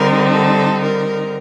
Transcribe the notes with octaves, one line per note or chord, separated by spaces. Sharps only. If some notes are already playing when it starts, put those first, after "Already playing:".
Already playing: D3 G3 C4 D#4 A#4
A4
A#4